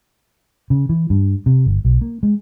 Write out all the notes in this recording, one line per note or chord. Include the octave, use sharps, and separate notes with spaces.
C#3
E3
G2
C3
G1
B1
A#3
G#3